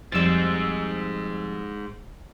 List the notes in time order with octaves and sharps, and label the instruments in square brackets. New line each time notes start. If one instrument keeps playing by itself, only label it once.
[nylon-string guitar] F2 G3 [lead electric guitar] G#2 G#3 [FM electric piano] E6 A6